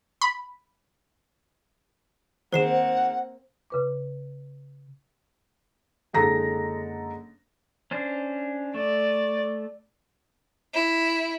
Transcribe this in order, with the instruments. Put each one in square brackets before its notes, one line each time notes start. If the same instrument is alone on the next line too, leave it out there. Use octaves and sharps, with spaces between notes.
[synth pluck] B5
[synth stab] D#3 G#3 [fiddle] A#3 C4 [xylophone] C5 C7 E7 [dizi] F#5
[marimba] C#3 B4 D6
[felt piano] F#1 D3 G#3 A4 A#5 A#6
[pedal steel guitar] C#4 D4 C5
[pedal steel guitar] A3 [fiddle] D5
[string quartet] E4